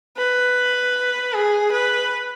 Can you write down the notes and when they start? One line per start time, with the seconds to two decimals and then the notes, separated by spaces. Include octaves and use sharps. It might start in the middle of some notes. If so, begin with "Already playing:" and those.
0.17 B4
1.34 G#4
1.72 B4